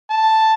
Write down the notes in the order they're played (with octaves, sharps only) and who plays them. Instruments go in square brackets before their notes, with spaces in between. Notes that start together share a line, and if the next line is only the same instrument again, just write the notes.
[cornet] A5